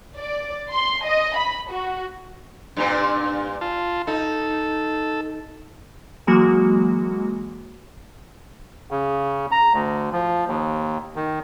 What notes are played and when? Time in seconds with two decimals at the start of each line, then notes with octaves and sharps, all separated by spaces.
0.17 D5
0.71 C6
1.05 D#5
1.37 B5
1.71 F#4
2.77 G2 A#2 C4
3.61 F4 A5
4.07 D#4 A4
6.27 E3 F#3 G#3 A#3 F#4
8.91 C#3
9.52 A#5
9.73 D2
10.12 F3
10.48 D#2
11.16 D#3